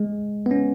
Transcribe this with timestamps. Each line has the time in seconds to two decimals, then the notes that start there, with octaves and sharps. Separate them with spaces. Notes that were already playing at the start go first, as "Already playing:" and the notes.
Already playing: G#3
0.46 B3
0.51 C#4